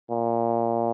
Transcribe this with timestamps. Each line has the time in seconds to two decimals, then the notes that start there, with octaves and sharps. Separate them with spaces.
0.10 A#2